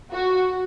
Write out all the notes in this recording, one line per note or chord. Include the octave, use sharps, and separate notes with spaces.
F#4